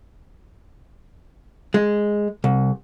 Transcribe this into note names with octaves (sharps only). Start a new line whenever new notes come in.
G#3
C2